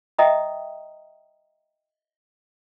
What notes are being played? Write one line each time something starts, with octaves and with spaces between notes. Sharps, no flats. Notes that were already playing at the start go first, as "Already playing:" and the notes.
D#5 E5 G5 A#5 D#6